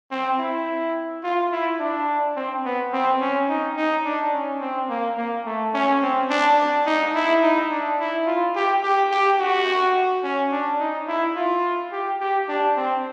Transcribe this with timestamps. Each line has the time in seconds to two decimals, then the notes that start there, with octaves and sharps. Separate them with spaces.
0.11 C4
0.39 E4
1.23 F4
1.52 E4
1.80 D4
2.36 C4
2.65 B3
2.93 C4
3.20 C#4
3.48 D#4
3.77 D#4
4.05 D4
4.33 C#4
4.61 C4
4.89 A#3
5.17 A#3
5.45 A3
5.74 C#4
6.02 C4
6.30 D4
6.57 D4
6.86 D#4
7.15 E4
7.42 D#4
7.71 D4
7.99 E4
8.27 F4
8.55 G4
8.83 G4
9.11 G4
9.39 F#4
10.23 C#4
10.51 D4
10.80 D#4
11.08 E4
11.36 F4
11.92 G4
12.20 G4
12.49 D4
12.77 C4